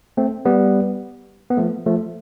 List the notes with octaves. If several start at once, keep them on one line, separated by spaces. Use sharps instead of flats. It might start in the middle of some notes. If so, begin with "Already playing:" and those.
A3 C4
G3 B3
B3
F3 A3
F3 A3